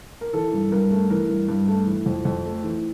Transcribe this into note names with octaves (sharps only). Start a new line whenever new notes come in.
A#4
E3 A4
G2
G2 A#4
A3
E3 A#4
G2
G2
A3
E3
F2
F2
A3
E3